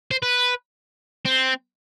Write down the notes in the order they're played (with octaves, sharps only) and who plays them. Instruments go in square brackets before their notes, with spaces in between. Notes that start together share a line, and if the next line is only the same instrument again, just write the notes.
[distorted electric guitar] C5
B4
C4